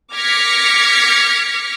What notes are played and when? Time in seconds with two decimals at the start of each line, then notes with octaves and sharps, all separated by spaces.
0.14 D6 F6 G#6 A#6 B6 C#7